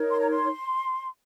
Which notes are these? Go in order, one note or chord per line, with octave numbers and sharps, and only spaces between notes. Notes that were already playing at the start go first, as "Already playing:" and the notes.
Already playing: D#4 A#4 C#5
C6
A#5
C6